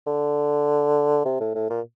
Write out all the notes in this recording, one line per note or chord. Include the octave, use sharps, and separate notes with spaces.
D3
C3
A2
A2
A#2